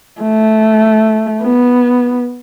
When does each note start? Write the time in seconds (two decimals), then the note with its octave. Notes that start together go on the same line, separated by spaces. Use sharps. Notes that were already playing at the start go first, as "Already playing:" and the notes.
0.21 A3
1.43 B3